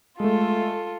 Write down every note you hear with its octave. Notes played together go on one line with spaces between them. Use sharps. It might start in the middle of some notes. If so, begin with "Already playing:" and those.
G#3 A3 F4 A4